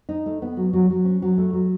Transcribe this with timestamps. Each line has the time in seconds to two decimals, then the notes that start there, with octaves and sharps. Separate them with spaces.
0.09 D#4
0.26 A3
0.42 B3
0.57 F#3
0.73 F#3
0.90 F#3
1.05 C#4
1.22 F#3
1.38 A3
1.53 F#3